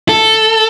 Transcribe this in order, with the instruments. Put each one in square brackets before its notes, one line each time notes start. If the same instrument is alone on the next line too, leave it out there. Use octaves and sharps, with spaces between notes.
[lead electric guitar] A4